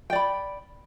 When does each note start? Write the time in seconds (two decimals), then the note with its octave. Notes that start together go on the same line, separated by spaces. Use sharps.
0.10 G5
0.13 D5
0.15 B5